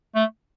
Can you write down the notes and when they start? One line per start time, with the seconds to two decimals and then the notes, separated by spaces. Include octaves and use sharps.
0.16 A3